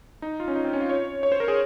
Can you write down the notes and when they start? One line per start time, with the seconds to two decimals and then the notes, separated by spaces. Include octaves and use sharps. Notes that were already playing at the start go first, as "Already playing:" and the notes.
0.22 D#4
0.40 F4
0.48 C#4
0.55 D#4
0.64 C4
0.73 C#4
0.81 F4
0.90 C#5
1.23 C#5
1.32 C5
1.40 A#4
1.48 G#4